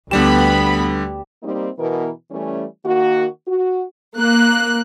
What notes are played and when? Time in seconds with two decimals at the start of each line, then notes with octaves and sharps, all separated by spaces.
0.11 D2 D3 G3 B3 G4 D5 B5 E7
1.43 G3 A#3 C4 D#4
1.79 B2 E3 B3 A#4
2.31 E3 G3 A3 C#4
2.86 D#3 A#3 F#4
3.47 F#4
4.16 A#3 F#6